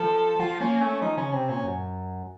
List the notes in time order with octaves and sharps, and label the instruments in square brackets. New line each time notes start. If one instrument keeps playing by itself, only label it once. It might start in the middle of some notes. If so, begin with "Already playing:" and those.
Already playing: [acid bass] F3 [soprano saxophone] A4
[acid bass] F3 [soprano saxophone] F4
[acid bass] A#3 [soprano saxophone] C#4
[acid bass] A3 [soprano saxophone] C#4
[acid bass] F3 [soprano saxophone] D#4
[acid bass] C#3 [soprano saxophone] C#4
[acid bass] C3 [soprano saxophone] C4
[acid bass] A#2 [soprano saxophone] C#4
[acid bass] F#2